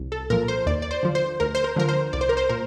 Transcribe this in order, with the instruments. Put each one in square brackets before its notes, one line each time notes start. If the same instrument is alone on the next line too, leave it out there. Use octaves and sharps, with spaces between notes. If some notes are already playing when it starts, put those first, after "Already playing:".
Already playing: [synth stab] C2
A4
A#2 F3 A#4
C5
D#2 D5
D5
C5
D3 F3
C5
D2 A#4
C5
A#4
D3 F3 A#4
C5
C2 D5
C5
A#4
C5
A#2 A#4